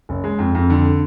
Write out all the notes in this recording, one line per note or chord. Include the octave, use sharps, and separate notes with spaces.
F#1
G#3
F2
F2
D3